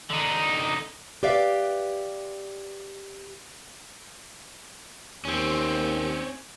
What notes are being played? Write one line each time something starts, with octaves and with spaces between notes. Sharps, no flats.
D3 D#4
G4 B4 D5 E5 F5
D#2 C4 C#4